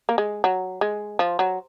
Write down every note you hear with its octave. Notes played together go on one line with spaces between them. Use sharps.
A#3
G#3
F#3
G#3
F3
F#3